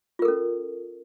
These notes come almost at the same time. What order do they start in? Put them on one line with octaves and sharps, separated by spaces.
F4 A#4 A4 C#4